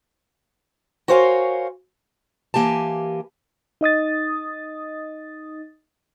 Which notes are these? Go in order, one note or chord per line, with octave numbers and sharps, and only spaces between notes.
F#4 A#4 C5 C#5 F5 G#5
E3 A#3 G4 G#5 A5
D#4 D#5 D#6 A6